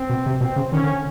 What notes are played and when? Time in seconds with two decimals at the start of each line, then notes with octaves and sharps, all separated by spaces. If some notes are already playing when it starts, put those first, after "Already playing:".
Already playing: C4
0.10 B2
0.26 C3
0.41 B2 C4
0.56 C#3
0.72 D#3 C#4
0.83 D3